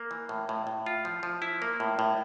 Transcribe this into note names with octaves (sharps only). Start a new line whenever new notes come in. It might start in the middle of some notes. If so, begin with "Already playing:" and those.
Already playing: A#3
E3
A2
A2
A2
F4
F3
F3
E4
A#3
A2
A2